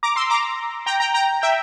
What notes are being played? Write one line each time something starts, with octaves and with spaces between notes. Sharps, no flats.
A#5 D6
C6 E6
A#5 D6
G5 A#5
G5 A#5
G5 A#5
E5 G5